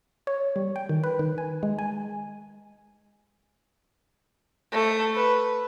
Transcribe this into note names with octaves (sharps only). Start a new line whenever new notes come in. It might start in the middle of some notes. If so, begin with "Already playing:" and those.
C#5
G3
G5
D#3
B4
D#3
G#5
G#3
G#5
A3
B4